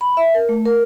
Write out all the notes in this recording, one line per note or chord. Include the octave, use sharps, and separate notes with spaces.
B5
E5
A#4
A3
A#4